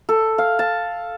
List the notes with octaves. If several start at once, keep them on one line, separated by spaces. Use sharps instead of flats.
A4
F5
A5